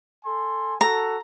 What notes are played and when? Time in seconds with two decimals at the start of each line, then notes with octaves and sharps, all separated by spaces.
0.24 A4 G#5 C6
0.81 F#4 A4 A#5